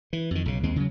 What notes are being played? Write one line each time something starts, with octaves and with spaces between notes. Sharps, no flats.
E3
F2 D#3
B1 C#3
D#2 G#3 C4
C#3 F#3